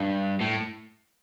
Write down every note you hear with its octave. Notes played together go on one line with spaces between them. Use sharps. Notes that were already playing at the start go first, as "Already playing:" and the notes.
Already playing: G2
A2